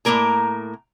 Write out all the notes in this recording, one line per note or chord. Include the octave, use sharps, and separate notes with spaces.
A2 G#3 A#3 A#4 A#5